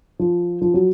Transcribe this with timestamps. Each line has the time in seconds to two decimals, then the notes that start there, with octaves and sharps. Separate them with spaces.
0.19 F3
0.62 F3
0.74 F#3